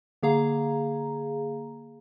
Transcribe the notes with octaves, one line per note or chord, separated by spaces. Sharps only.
D3 A#3 G#4 F5 A#5